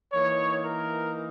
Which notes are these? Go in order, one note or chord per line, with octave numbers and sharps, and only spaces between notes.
E3 A#3 D#4 C#5
A#4